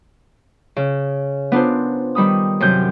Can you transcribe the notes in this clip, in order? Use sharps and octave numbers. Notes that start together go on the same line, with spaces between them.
C#3
B3 D4 F4 A#4 C5
D#3 G3 B5 D#6
F#2 C3 F#3 G6